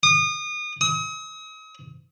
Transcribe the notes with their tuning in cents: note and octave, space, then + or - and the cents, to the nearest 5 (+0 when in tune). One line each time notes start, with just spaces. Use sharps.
D#6 -30
D#6 +40